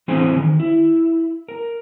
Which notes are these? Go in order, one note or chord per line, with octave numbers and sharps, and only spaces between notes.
E3 C4 D4 G#4 C5 G#5
D#3
E4
A#4